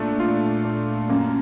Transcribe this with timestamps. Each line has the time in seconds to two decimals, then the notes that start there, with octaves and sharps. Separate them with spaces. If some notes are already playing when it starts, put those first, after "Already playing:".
Already playing: A#2 A3 D4
0.20 F4
0.65 D4
1.09 F#2 A#3